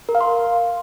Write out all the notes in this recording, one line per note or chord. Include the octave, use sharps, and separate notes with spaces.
A#4
F5
C6